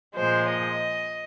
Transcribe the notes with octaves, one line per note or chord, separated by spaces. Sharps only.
A#2 F3 G#3 C5
D#5